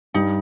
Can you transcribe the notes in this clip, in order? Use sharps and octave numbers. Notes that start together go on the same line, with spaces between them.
G2 G3 D#4